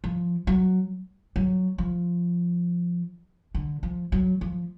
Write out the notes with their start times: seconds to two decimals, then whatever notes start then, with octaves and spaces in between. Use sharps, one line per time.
0.04 F3
0.47 F#3
1.36 F#3
1.78 F3
3.55 D3
3.83 F3
4.12 F#3
4.41 F3